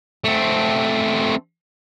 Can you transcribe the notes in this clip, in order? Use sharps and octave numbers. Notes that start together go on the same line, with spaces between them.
A3 C4